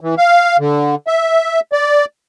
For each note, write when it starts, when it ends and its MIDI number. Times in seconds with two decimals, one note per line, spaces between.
0.01 0.15 52
0.18 0.57 77
0.59 0.95 50
1.07 1.60 76
1.73 2.05 74